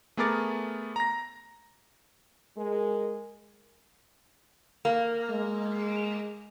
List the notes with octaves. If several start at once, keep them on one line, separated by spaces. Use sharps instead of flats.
A3 B3 G#4 A#4 D6 A6
A#5 A#6
G#3 A#4
A#3
G#3